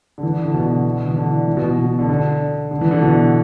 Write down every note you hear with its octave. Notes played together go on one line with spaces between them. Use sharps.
D3
E3
D3
B2
E3
D3
E3
B2
B2
D3
D3
D3
E3
D3
B2